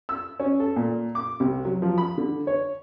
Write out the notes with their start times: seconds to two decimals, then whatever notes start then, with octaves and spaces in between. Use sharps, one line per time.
0.09 E6
0.40 C#4
0.60 A4
0.76 A#2
1.15 D6
1.40 C2
1.65 F#3
1.82 F3
1.98 B5
2.18 D3
2.47 C#5